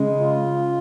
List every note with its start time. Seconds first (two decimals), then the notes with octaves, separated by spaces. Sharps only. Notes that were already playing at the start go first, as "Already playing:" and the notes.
Already playing: C#3 G#3
0.20 F4